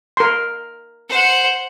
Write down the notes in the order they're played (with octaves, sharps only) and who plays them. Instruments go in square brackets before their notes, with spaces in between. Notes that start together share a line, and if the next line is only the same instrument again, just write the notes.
[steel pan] A#4 C6
[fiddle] C5 F#5